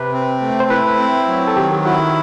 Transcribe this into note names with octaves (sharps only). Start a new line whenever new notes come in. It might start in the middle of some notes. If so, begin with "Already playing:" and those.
Already playing: C3 B4
C4
A3
C5
E4 B4
C4
F#3
A4
D#3 G4
E4 F#4